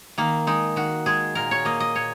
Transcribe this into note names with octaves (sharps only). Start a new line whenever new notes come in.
D#3 A#3
G#3 D#4
D#3 F#4
G#3 G#4
A#2 A#4
C#5
A#3 D#5
D#5
A#2 C#5